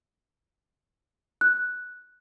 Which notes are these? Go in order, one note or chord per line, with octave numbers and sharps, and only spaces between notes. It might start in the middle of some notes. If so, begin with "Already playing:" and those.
F#6